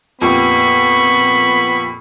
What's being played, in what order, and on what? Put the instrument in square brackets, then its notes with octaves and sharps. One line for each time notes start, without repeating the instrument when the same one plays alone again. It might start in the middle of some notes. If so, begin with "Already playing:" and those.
[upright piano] F2 A#2 G4 [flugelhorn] B3 [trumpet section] B5 [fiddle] C#6